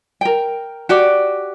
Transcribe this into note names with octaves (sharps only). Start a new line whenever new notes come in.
A#4 G5
F#4 G4 D5